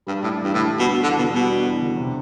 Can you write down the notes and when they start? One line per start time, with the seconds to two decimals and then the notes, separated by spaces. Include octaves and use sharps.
0.07 G2 G3
0.23 A2 D4
0.39 E2 G2
0.54 A2 D3
0.71 G3
0.79 B2
0.87 D4
1.03 E2 D3
1.18 B2 D3
1.34 B2 G3
1.51 D4
1.66 E2
1.82 D3
1.98 C3